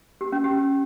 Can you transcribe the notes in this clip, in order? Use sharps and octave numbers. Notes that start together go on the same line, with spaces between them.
G4
C#4
G4